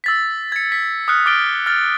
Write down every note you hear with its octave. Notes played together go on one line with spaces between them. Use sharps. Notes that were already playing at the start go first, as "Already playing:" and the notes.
E6 A6 B6
G#6 C#7
B6
D#6 F6 F#6 C#7
D6 F6 A6 D7 G7
F6 A6